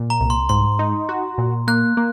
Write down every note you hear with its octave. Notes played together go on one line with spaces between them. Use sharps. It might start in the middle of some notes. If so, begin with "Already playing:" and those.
Already playing: A#2
A#5
C2
C6
G#2 C6
D#4
F#4
A#2
A#3 F#6
A#3